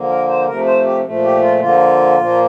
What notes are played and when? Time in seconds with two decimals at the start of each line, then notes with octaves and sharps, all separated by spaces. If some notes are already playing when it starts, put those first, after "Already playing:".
Already playing: D3 F3 A#3
0.09 A#4
0.27 C5
0.47 C3 F3 A3 A#4
0.66 C5
0.84 G4
1.04 A#2 F3 A3
1.23 G4
1.41 F4
1.60 D3 F3 A#3 F4
2.17 A#2 F3 A#3